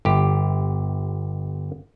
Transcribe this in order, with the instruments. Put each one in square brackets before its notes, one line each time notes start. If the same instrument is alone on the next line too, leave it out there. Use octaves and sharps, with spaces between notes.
[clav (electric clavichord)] G1 G4